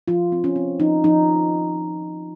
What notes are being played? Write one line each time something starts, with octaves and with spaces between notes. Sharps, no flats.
F3 F4
C4
C#4
C4
F3 D#4
F3 D#4